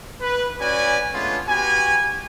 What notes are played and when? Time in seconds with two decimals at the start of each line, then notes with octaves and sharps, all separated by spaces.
0.21 B4
0.61 C#4 F#4 B4 D5 G#5
1.13 G#3 A3 B3 C#4 D4 F4
1.47 B3 F#4 G4 G#5